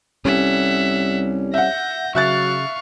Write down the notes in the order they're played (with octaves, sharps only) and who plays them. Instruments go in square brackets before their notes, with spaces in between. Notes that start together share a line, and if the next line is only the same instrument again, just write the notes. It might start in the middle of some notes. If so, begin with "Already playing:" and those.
[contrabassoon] C2 [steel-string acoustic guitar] G3 C#4 A4 [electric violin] E5 F#5
[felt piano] E5 F#5 [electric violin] G6 A#6
[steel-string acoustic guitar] C#3 [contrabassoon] F#3 [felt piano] E5 F#6 A6 [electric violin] F5 C#6